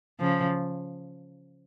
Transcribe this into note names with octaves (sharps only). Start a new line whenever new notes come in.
C#3 F3